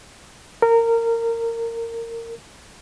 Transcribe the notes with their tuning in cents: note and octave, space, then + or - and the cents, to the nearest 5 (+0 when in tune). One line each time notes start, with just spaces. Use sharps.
A#4 -20